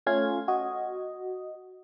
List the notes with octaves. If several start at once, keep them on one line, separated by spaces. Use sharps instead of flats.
A3 C#4 F4 F5 G#6
F#4 D#5